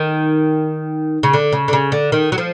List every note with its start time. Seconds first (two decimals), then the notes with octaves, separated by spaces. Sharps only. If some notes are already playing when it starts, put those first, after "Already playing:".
Already playing: D#3
1.23 C#3
1.33 D3
1.52 C#3
1.68 D3
1.73 C#3
1.92 D3
2.12 D#3
2.32 F#3
2.38 F3